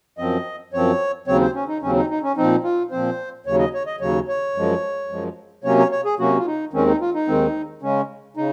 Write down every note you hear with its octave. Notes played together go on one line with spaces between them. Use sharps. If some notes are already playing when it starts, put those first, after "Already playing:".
F#2 F3 C4 D#5
F#2 F3 C4 C#5
D#2 C#3 F#3 C4 C#5
C5
C#4
D#4
D#2 C#3 F#3 C4 C#4
D#4
D#4
C#4
A#2 F3 C4 D#4
F4
A#2 F3 C4 C5
D#2 C#3 F#3 C#5
D#5
C#5
D#5
D#2 C#3 F#3 C#5
C#5
F#2 F3 G#3
F#2 F3 G#3
C3 F#3 A#3 C#4 C#5
C#5
C#5
G#4
C3 F#3 A#3 C#4 F#4
F4
D#4
D#2 D#3 G#3 C4 C#4
D#4
F4
D#4
D#2 D#3 G#3 C4
C#3 G#3 C#4
C#3 D#4